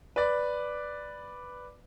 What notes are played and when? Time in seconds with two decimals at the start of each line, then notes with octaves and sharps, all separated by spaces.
0.16 B4 D5